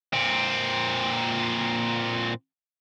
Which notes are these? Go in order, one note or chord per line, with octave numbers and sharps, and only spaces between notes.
A#2 C4